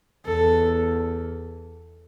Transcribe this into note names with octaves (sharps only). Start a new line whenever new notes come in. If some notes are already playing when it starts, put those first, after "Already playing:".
E2 A4